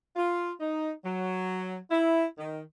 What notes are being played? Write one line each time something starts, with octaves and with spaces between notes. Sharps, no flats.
F4
D#4
F#3
E4
D#3